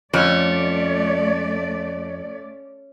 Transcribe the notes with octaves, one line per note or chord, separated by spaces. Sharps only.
F2 A3 C#4 D5